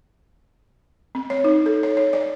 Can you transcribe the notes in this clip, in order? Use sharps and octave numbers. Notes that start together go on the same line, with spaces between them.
C4
C#5
D#4
A4
C#5
C#5
D5